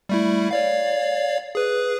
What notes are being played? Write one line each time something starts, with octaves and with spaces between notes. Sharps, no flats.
G3 A3 E4
C#5 D5 F5
G#4 B4